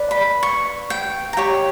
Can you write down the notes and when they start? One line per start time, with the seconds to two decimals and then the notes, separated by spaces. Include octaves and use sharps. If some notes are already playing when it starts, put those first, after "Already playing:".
Already playing: B4 D5
0.11 B5
0.43 C#6
0.90 G5
1.33 A#5
1.37 G4 C#5 G5